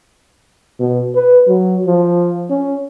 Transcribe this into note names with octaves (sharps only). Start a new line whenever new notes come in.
B2
B4
F#3
F3
C#4